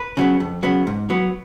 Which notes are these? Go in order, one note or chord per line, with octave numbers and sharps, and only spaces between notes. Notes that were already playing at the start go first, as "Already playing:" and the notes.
Already playing: B4
C#3 F#3 B3
F2
C#3 F#3 B3
G#2
F#3 B3